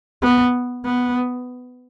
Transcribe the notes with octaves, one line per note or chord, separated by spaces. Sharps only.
B3
B3